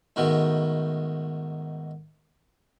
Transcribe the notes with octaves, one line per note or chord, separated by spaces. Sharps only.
G#2 B2 D#3 A3